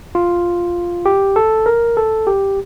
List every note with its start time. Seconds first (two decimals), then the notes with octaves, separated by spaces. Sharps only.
0.15 F4
1.06 G4
1.36 A4
1.66 A#4
1.97 A4
2.27 G4